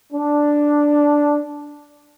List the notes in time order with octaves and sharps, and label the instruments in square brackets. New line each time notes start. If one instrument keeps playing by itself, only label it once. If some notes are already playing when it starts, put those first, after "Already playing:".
[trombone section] D4